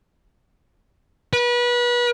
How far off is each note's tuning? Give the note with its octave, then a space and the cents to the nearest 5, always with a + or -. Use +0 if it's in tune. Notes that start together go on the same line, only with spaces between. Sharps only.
B4 -30